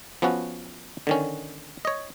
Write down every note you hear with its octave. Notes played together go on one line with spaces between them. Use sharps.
F3 B3 C#4 F#4
D3 D#3 C#4
C#5 D#5